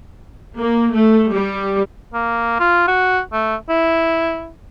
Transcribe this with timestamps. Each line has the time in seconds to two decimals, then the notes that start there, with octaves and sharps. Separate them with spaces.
0.59 A#3
0.94 A3
1.31 G3
2.14 A#3
2.60 F4
2.88 F#4
3.33 A3
3.69 E4